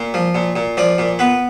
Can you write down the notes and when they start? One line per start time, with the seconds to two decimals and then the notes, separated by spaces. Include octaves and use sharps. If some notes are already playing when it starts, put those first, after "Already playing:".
Already playing: A#2
0.14 F3
0.35 A#2
0.56 A#2
0.77 F3 D5
0.98 A#2
1.19 B3 B4